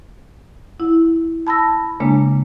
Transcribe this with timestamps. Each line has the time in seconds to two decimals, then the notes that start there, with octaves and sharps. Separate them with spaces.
0.80 E4
1.47 A5 B5 E6 A#6
2.00 C#3 G#3 A#3 D4